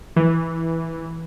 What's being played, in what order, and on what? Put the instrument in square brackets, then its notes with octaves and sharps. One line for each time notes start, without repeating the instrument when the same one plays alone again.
[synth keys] E3